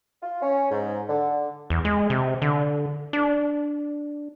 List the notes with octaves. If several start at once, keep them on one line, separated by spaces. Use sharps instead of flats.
F4
C#4
G#2
D3
E2
G#3
C3
D3
D4